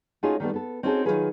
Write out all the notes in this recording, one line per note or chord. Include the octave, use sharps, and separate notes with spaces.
A3 C#4 D#4 F4 F#4 G#4
D#3 G3 A3 B3
B3 A4
C4 C#4 D#4 F#4 G#4 A4
D#3 E3 F#3 F4 G#4 B4